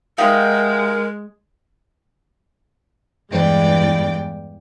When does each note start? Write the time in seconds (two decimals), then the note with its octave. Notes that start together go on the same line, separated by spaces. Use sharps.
0.18 G#3 D#4 F#4 G4 A#4 E5 F5
3.30 E2 G2 E3 G#3 D5 G5